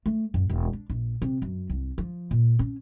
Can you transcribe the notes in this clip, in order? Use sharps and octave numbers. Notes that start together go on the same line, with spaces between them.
A3
F#2
E1
D4
A#1
C3
F#2
C2
F3
A#2
C#4